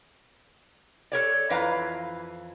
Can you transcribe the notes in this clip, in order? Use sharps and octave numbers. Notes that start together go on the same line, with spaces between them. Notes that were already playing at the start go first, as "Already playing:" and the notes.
A4 A#4 C#5 D5
F2 E3 B4 F5 A#5